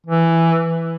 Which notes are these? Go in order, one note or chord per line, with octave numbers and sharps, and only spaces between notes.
E3